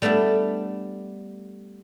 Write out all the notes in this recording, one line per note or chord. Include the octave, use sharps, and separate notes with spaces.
G3 A3 B3 D4 E4